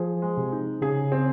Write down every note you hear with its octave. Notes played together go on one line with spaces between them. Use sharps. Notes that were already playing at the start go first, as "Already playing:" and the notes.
Already playing: F3 G#4
G#3
C3
D#4
C#3 G#4
C4